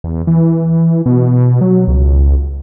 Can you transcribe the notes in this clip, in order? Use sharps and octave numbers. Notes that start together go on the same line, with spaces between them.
E2
E3
B2
F#3
C#2